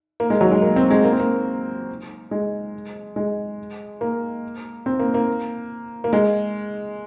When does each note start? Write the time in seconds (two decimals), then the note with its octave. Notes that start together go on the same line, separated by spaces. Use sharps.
0.20 A#3
0.30 G#3
0.41 F#3
0.51 G#3
0.62 A#3
0.76 C4
0.90 G#3
1.04 A#3
1.12 C4
1.20 A#3
2.31 G#3
3.16 G#3
4.01 A#3
4.86 C4
4.99 A#3
5.14 A#3
6.04 A#3
6.13 G#3